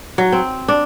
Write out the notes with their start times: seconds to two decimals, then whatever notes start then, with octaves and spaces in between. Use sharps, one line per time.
0.18 F#3
0.32 C4
0.68 D4